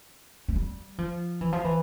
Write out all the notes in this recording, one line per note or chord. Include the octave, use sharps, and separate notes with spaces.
A3
G3
F3
E3
F3
E3